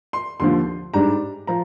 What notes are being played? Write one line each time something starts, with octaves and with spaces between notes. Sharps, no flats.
C6
D#2 D3 F3 C6
G#2 G3 D4 A#5
F3 A#5